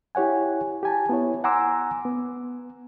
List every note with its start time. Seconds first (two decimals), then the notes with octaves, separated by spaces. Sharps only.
0.15 E4 G4 C#5 F#5 G#5
0.83 G4 G#5 A5
1.09 B3 E4 C#5
1.44 F#5 G#5 A#5 C6 D6 E6
2.05 B3